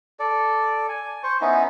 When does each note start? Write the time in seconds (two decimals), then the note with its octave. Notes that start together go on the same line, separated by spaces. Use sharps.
0.19 A4 D5
0.89 G#5
1.23 C5 C#6
1.41 B3 C#4 D#4 E4